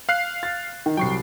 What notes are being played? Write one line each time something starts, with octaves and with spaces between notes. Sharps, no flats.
F5 F#6 C7
A6
D#3
C2 F#3 G5 C#6 C7